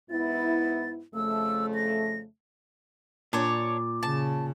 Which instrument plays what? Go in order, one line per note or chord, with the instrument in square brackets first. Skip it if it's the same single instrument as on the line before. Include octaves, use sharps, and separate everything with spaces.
[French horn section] G#2 B3 E4 [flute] A6
[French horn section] F2 C#3 A3 [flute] E6
[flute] A#6
[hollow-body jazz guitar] A#2 [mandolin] D4 C#5 [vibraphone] D6
[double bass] C#3 [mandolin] A5